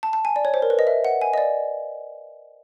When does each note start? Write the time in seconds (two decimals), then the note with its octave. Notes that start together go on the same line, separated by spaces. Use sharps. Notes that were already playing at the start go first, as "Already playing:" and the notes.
0.03 A5
0.13 A5
0.25 G#5
0.36 D5
0.45 C#5
0.54 C5
0.62 A#4
0.70 B4
0.79 D#5
0.87 E5
1.05 F#5
1.21 G#5
1.33 D#5
1.38 D5